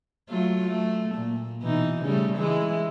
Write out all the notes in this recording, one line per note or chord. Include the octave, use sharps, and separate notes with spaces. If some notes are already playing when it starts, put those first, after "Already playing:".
F#3 A3 F4
A3
A#2
B2 E3 D#4
C#3 G3 A3
E3 G#3 E4